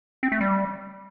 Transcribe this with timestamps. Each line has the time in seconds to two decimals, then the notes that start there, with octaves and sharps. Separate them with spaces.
0.23 C4
0.32 A3
0.41 G3